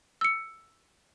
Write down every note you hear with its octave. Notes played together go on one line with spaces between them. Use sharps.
E6 C#7